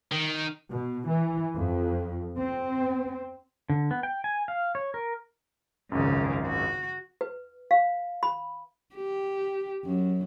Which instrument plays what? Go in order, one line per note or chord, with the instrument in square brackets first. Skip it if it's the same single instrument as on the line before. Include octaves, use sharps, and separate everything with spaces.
[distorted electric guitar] D#3
[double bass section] B2
E3
F2
C4
[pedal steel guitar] D3
B3
G5
G#5
F5
C#5
A#4
[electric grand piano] G#1 C#2 F#2 [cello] C#3 F3
[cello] F#4
[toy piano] B4
F5
B5
[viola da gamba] G4
F#2